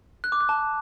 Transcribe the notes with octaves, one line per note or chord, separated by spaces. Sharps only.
F#6
D6
F#6
A5